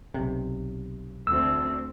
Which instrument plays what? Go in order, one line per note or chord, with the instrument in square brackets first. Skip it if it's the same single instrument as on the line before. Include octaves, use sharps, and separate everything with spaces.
[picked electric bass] B1 C3
[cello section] D2 C4 [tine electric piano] E6